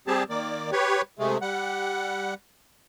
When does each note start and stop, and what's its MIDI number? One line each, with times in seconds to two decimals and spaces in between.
0.07 0.23 55
0.07 0.23 60
0.07 0.23 67
0.07 0.23 68
0.07 0.23 81
0.30 0.70 51
0.30 0.70 58
0.30 0.70 74
0.72 1.01 67
0.72 1.01 71
0.72 1.01 73
1.19 1.38 48
1.19 1.38 56
1.19 1.38 57
1.42 2.34 55
1.42 2.34 78